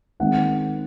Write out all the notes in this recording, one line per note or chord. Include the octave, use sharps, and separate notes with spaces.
D#3 G#3 C4 F#5